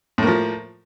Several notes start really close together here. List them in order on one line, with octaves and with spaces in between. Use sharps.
A2 A#3 F3